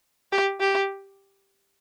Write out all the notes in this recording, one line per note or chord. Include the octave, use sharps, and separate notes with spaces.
G4
G4